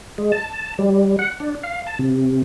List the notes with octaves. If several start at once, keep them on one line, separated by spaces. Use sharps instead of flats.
G#3
A5
G3
F#5
D4
F5
A5
C3